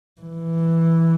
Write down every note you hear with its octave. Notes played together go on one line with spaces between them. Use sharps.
E3